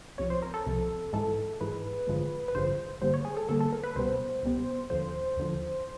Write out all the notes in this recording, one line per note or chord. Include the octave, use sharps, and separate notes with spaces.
C2 C3 F3 C#5
C5
A#4
A4
C2 C3 F3
G#2 E3 G#3 A4
G#2 E3 G#3 B4
A1 G2 D3 F3 G#3
B4
A1 G2 D3 F3 G#3 C5
G2 D3 G3 A#3 C5
C#5
G#4
A4
G2 D3 G3 A#3 A4
A4
A#4
B4
C#2 B2 G3 B3 C5
C#2 B2 G3 B3
D#2 D3 F3 C5
D#2 D3 F3